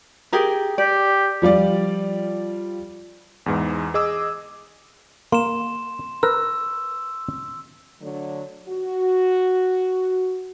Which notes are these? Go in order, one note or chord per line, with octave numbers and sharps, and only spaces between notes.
G4 G#4 A#4
G4 D5
F3 G3 F4 D5
E2 G#2 E3
G#4 D#5 D6 E6
A#3 C6 E7
A#4 B4 A#5 E6
D3 F#3 A3
F#4